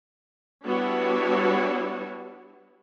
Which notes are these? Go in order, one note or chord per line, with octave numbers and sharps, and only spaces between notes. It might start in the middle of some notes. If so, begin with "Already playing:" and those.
G3 B3 D4 E4 F#4 C#5